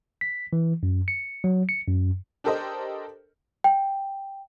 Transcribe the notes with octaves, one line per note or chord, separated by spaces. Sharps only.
B6
E3
F#2
C#7
F#3
C#7
F#2
D4 G4 A4 A#4 C5 D#5
G5